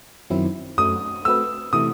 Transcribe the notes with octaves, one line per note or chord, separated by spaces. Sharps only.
F#2 D#3 F#3 C4 E4
F#2 F#3 A3 D#6
A3 C4 F#4 B4 E6
C3 E3 A3 D#6